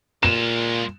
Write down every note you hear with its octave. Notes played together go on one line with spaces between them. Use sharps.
A#2 G#3 F4 E7